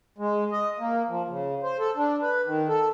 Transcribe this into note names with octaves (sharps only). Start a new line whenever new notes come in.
G#3
D#5
A#3
F3
C#3
C5
A4
D4
B4
D#3
A4